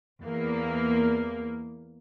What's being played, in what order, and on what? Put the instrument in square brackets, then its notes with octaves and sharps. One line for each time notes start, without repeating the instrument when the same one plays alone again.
[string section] E2 A#3